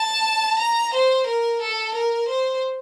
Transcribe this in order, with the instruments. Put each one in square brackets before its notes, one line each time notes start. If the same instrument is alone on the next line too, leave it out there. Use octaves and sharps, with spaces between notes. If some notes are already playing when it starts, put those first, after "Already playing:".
Already playing: [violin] A5
A#5
C5
A#4
A4
A#4
C5